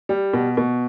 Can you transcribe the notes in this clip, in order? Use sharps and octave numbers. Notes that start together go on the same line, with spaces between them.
G3
B2
B2